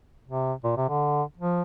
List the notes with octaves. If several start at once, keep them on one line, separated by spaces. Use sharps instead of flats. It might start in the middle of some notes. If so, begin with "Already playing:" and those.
C3
A#2
C3
D3
F3